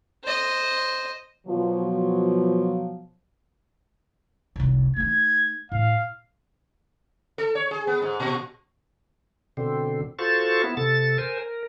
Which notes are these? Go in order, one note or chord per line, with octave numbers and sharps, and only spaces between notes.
C5 D#5
B2 F3 F#3
F1 C2
A3 D#4 G#6
A2 F5
A4
C#5
G#4
B3
G#2
A#2
B2 D3 C4
F4 F#4 A4 C5 C#6 A6
B3 E4
C3 A4 A6
A#4 C5 G#5
A#4